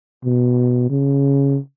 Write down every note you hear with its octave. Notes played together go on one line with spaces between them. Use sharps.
B2
C#3